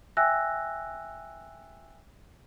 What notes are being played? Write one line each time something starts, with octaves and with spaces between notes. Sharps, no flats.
E5 G5 G#5 E6 F#6 A#6